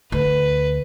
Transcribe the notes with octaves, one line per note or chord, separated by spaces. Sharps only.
D2 B4